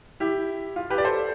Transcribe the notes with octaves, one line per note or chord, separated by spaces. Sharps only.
E4 G4
F4
G4 B4
D5
A4 C5